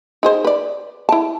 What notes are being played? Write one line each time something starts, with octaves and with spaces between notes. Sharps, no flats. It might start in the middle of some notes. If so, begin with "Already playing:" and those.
D#4 G#4 C5
B4 D5
E4 A5